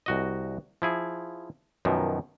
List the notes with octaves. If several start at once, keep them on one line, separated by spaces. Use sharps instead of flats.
C2 F#4 D#5
F3 E4 G#4
F#2 B2 D#3 F3